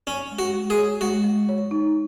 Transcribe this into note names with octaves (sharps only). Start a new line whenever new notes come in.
C#4 C#5
G#3
F#4
G#3
G#4
C#5
G#3 F#4
G#3
C#5
D#4